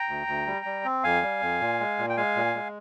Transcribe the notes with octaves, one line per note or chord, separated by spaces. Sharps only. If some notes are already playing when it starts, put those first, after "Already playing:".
Already playing: G5 A#5
D2
D2
G3
G3
C4
F2 F5 G#5
G3
F2
A#2
G#3
A#2
G5
G#3 F5 G#5
A#2
G#3